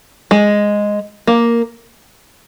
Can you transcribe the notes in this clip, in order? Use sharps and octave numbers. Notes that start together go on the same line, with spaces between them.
G#3
A#3